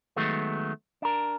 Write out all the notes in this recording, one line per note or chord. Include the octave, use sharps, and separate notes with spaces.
D#3 F#3 G#3 A3 B3
D4 A#4